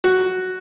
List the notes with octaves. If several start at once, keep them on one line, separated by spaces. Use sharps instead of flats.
F#4